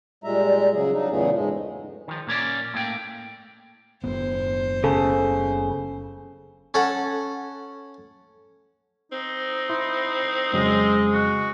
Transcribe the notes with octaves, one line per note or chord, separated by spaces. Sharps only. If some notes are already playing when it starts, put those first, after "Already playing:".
A#2 G3 G#3 E5 A#5
C#3 F#3 G#4
F#3 D4 D#4
E2 A#2 C#3 A3 B3 G#4
G#2 G#3
D#3 F3
A#2 A#3 C#4 D5
A2 A#3 G5
F#1 B3 C5
C#3 A4
C#4 A4 F#5
C4 D#4
E4 B5 C6
F2 C#3 F#3 G#3 D#5
F#4